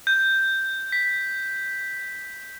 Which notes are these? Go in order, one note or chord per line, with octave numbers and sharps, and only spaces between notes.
G6
B6